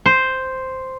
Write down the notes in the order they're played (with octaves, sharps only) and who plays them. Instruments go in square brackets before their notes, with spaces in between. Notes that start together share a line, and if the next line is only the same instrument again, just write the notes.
[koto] C5